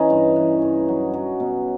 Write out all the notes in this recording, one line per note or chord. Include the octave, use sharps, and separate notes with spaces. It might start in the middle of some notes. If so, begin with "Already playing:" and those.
Already playing: E3 C#4 D#4
G2
E3
G2
F#3
F#3
B2